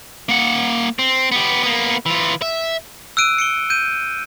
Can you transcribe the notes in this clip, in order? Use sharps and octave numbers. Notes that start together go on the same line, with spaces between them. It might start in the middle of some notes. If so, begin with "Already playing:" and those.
A#3 F#5
C4
B3 G4
A#3 B3
E3 F4
E5
E6 F#6 D7 D#7
C#7 D7 G7
G6 D#7